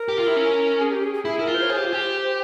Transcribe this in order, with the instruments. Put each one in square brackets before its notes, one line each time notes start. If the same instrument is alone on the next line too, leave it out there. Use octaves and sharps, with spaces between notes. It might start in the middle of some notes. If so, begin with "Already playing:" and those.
Already playing: [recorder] A#4
[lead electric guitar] G4
F4
E4
C#4
[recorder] G#4
G4
G#4
G#4
[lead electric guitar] E4 [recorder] G#4
[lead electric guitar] E4 [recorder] A#4
[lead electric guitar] F4
[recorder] C5
C#5
[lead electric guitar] G#4 [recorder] C5
[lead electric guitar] G4
F4
G4